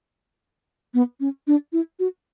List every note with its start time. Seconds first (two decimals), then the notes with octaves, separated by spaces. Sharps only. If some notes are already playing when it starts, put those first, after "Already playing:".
0.94 B3
1.20 C#4
1.47 D4
1.73 E4
1.99 F#4